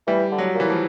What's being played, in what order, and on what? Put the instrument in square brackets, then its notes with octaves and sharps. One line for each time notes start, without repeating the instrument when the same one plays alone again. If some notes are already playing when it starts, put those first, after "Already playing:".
[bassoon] E3 [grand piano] G3
[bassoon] D3
[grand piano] F#3
[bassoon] A#2
[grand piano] E3
F3